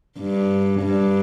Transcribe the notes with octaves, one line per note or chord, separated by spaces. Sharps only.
G2
G2